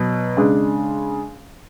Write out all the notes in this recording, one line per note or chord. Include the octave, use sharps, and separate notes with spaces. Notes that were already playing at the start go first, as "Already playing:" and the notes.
Already playing: B2 F#3 B3
C#3 G#3 D4 G#4